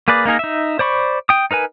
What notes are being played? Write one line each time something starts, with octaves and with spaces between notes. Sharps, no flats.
A#3 G#4 B4 D5
A#3 D#4 G#4 A#4
D#4 E5
C5 D5 B5 C#6
G5 D#6
D#4 A#4 B4 G#5